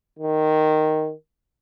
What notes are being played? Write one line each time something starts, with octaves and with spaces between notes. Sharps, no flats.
D#3